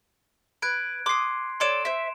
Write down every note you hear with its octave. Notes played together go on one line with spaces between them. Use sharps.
B4 F#6 G#6 D7
C6 D6 D#6 C7
A4 C#5 D5 C6 D7 E7
C5 E5